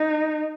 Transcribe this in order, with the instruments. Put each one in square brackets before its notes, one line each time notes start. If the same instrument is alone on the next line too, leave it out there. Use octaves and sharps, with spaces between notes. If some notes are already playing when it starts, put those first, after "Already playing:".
Already playing: [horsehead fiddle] D#4